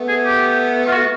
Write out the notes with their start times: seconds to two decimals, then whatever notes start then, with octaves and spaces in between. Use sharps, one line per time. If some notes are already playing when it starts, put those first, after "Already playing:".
Already playing: A3 B3
0.08 G#4
0.25 G4
0.87 F4
0.92 F#4